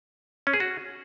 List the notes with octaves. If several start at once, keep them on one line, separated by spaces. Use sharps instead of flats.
C#4
G#4
F#4